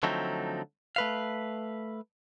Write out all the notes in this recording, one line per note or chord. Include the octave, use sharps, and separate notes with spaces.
D3 F3 F#3 A3 C4 D#4
A3 B4 F5